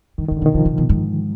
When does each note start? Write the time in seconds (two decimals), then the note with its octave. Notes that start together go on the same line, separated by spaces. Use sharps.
0.18 G2 D#3
0.28 G#2 D#3
0.37 D3
0.42 B2
0.46 D#3
0.54 B2 F3
0.65 C3
0.78 B2
0.89 G#2